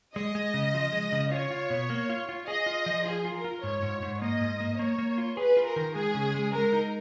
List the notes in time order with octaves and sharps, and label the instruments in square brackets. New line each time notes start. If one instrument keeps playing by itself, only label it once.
[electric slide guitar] G#3 [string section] D#5
[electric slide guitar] G#3
C#3
F3
G#3
C#3
[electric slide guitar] F4 [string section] C#5
[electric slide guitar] F4
B2
A#3
F4
F4
[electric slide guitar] G#4 [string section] D#5
[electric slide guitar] F4
F3
[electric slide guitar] F4 [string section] G#4
[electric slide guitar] F4
[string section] A#4
[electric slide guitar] F4
[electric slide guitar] G#2 [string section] C#5
[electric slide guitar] G#2
G#2
[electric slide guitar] A#3 [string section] D#5
[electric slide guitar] G#2
A#3
[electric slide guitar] A#3 [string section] C#5
[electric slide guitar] A#3
F4
[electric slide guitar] G#4 [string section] B4
[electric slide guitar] F4
[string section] A#4
[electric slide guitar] D#3
[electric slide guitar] G#3 [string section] G#4
[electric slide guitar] C#3
G#3
[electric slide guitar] G#3 [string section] A#4
[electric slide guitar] D#4